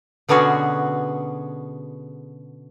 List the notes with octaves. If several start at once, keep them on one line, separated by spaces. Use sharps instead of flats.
B2 D3 B3 C#4 F#4 G#4